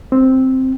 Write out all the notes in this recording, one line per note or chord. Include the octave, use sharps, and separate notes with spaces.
C4